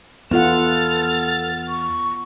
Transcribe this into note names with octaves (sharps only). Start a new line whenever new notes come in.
E2 B3 F4 A4 F#5 F6 A6
C#6